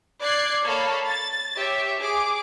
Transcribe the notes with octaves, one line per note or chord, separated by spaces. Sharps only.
D5 F#6 G#6 C7
A#3 A4 C#5 F5 A5 B5
A6
G4 C#5 E5
G#4 D6